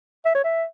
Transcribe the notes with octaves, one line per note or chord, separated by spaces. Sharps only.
E5
C#5
E5